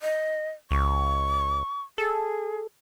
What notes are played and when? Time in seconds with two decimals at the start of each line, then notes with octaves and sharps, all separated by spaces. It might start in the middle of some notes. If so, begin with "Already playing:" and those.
0.01 D#5
0.71 C#2 C#6
1.98 G#4 A4